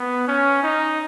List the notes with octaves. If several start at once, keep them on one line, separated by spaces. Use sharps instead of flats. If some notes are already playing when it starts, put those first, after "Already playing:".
Already playing: B3
C#4
D#4